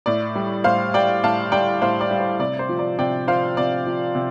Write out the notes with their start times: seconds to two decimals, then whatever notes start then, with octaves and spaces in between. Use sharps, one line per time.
0.06 A2 D5
0.35 G3
0.64 A2 C5 F5
0.94 G3 D5 G5
1.24 A2 F5 A5
1.52 G3 D5 G5
1.82 A2 C5 F5
2.01 D5
2.11 G3
2.20 C5
2.39 C3 D5
2.59 C5
2.69 F3
2.79 D5
2.99 C3 D5 G5
3.28 F3 C5 F5
3.57 C3 D5
3.86 F3
4.15 C3